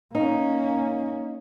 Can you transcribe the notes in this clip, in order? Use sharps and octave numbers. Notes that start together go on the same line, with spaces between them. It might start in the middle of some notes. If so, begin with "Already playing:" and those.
A#3 C#4 D#4